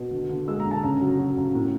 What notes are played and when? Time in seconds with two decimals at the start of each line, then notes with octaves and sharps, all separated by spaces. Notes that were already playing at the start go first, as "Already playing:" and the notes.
Already playing: B2
0.11 D3
0.29 D3
0.48 G#3 E6
0.60 A#5
0.65 D3
0.71 A5
0.83 C#3 A#5
1.01 F#3
1.18 F#3
1.37 C#3
1.55 A2